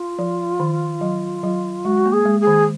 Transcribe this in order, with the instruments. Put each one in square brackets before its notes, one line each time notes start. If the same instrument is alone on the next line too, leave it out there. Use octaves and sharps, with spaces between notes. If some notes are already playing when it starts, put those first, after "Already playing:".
Already playing: [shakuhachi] F4
[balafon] F3
D#3
F#3
F#3
[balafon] G#3 [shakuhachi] F#4
[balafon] A#3
[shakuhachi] G#4
[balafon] G#3
[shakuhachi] G#4
[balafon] D#3